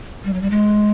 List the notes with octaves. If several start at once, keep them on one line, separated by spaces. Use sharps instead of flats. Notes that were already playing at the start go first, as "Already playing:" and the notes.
G3
F#3
G3
G#3